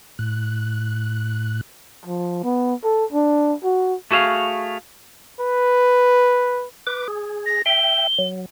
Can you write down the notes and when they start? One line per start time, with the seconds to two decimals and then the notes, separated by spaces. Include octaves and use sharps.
0.19 A2 F#6
2.06 F3
2.44 B3
2.84 A4
3.13 D4
3.64 F#4
4.11 A3 F#4 G#4 E5 F5
5.41 B4
6.87 B4 D6
7.08 G#4
7.46 A#6
7.66 E5 G5 G7
8.19 F#3